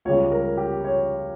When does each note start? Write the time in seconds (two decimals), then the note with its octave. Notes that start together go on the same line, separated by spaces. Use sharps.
0.05 C#2 C#3 G3 C#5
0.32 A#4
0.57 G4
0.84 C#5